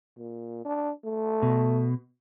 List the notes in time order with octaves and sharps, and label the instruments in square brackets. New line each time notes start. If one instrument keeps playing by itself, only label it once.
[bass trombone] A#2
D4
A3
[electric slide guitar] B2